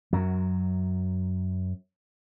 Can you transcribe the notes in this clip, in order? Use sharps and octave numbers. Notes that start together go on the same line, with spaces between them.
F#2 F#3